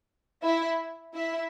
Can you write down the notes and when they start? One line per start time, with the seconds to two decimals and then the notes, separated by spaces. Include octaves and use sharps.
0.42 E4 E5
1.14 E4 E5